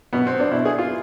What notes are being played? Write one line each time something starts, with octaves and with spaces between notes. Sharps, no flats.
B2 B3
C4
D4
B2 E4
G#4
F4